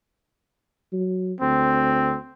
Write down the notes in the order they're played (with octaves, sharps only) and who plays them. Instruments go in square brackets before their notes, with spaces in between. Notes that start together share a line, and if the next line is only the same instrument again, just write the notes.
[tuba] F#3
[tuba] D2 [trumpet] C4